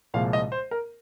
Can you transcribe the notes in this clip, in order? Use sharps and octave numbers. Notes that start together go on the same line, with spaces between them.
C2 A#2 F3 G#3 F5
D#5
C5
A#4